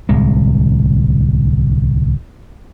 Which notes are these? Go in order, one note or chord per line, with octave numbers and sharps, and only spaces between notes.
D1 C2 G#3